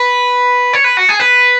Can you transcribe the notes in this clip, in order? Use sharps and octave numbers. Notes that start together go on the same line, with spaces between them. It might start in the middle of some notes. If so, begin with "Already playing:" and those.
Already playing: B4
C#5
B4
F#4
G#4
B4